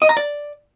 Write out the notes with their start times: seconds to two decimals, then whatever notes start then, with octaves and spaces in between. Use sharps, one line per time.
0.02 D#5
0.09 A#5
0.17 D5